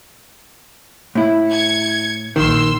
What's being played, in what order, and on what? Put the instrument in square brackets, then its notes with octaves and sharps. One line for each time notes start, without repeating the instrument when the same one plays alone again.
[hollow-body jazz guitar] A2 E4
[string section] G#6 C#7
[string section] A#1 C6 E6 [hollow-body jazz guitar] D#3